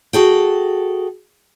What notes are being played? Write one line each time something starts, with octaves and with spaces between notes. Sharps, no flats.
F#4 G#4 A4 G5